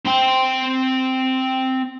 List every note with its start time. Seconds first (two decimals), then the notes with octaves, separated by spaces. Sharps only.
0.05 C4 G5